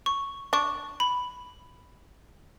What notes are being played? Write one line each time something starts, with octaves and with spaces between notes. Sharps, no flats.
C#6
D4 C#6
B5